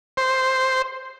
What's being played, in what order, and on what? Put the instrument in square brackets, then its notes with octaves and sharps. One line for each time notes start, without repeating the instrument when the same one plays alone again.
[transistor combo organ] C5